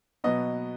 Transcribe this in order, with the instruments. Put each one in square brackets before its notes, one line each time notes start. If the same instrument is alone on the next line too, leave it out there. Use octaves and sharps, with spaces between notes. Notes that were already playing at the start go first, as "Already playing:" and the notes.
[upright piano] B2 F#3 B3 D#5